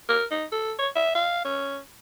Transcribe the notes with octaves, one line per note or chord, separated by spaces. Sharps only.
A#4
D#4
A4
C#5
E5
F5
C#4